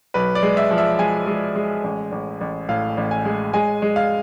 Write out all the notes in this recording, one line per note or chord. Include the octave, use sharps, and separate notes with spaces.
B1 B4
D5
G#3
E5
F3
E5
G#3 G#5
G#3
G#3
A1
A1
A1
A2 F5
A1
G#5
G#3
G#3 G#5
G#3
F5